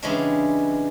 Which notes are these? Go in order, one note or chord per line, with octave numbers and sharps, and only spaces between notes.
C#3 E3 G3 G#3 C#4 D4